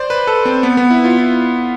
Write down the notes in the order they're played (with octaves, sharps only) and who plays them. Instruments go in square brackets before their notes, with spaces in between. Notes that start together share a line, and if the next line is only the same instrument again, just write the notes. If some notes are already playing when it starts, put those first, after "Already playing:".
Already playing: [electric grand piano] C5 D5
B4
A4
C4
B3
B3
E4
F4
E4